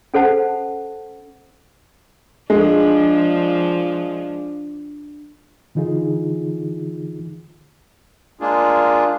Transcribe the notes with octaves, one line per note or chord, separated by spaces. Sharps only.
C#4 A4 C5 F#5 A5
F3 G#3 D4
D3 E3 D#4 F4 G#4
G#3 A#3 D4 F4 G#4